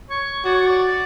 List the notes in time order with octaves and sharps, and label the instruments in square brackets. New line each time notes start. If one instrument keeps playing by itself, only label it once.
[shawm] C#5
[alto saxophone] F#4 [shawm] D5
[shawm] C#5
D5